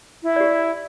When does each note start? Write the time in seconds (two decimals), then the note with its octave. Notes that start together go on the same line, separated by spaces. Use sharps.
0.23 E4
0.36 G4 D5